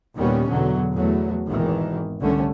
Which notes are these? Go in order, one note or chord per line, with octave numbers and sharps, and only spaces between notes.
D#2 A#2 D#3 G3 B3 C#4
E2 B2 D3 F#3
E2 F#3 A3
G#1 E2 B2 D#3 E3
C2 D3 G3 A3 C#4